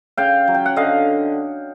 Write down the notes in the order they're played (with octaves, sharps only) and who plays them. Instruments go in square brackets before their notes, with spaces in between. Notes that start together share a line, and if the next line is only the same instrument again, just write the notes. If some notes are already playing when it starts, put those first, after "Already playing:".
[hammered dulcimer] C#3 F5 G5
F#3
G5
F#5
D3 D#5 F5